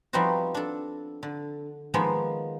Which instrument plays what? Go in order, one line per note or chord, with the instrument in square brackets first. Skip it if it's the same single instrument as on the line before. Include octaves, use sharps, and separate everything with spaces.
[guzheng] F3 G3 B3 C4 D#4 F#4
D4 A4
D3
D#3 F3 G#3 A#3 B3